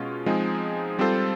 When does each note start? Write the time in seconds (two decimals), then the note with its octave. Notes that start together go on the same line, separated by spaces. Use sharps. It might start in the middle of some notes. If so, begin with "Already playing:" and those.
Already playing: B2 G#3 C#4 F4
0.26 F3 G#3 C4 D#4 G#4
0.99 G3 C4 F4 A4 C5